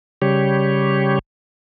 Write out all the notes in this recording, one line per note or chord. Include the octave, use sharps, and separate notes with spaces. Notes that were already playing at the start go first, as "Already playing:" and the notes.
C#3 G3 G4 C#5